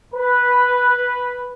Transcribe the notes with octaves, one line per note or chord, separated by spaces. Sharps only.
B4